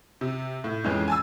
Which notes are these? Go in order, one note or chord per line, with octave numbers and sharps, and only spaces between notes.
C3
A2
F2 E3 G#3 C#4
G#5 A5 E6